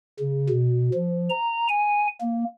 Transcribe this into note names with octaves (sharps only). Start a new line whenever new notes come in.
C#3
B2
F3
A#5
G#5
A#3